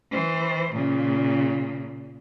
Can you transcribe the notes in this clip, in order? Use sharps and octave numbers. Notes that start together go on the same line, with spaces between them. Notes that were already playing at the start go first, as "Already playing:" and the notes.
E3 C5
A#2 C#3